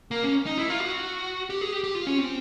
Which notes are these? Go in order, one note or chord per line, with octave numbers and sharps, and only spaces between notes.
A#3
C#4
D#4
E4
F4
F#4
G4
G#4
G4
G4
F4
C#4
C4